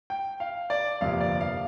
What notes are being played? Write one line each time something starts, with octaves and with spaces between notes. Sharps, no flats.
G5
F5
D5
G1 F2 C3 A#3 F5
D5
F5